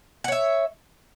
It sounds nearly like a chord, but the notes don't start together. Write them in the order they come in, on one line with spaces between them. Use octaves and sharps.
F#5 C#5 E5